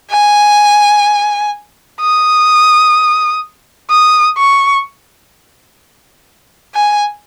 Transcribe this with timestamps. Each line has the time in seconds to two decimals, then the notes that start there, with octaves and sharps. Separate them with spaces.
0.11 G#5
2.01 D#6
3.91 D#6
4.38 C#6
6.75 G#5